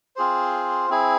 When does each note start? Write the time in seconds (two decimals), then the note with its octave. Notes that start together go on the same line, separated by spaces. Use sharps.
0.16 C4 F4 G#4 C5
0.90 C4 E4 G#4